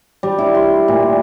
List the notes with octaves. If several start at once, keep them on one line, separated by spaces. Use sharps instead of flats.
G3
E4
C6
A#2